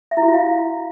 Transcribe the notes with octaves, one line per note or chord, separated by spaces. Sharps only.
E5
E4
F#4
F4
F5